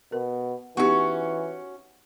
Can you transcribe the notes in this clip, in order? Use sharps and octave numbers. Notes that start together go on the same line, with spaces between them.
B2 A#4
E3 B3 C#4 D#4 F#4 G4